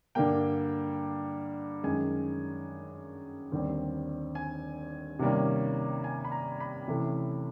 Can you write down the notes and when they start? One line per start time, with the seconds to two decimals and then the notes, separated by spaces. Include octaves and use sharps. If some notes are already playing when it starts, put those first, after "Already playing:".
0.15 G2 D3 G3 A#3 G5
1.83 F#2 D#3 G#3 G#5
3.52 D#2 D3 G3 C4
4.35 G#5
5.19 C3 D#3 G3 A#3 C#4
6.04 G#5
6.25 B5
6.32 A#5
6.60 B5
6.88 C3 E3 A3 C#4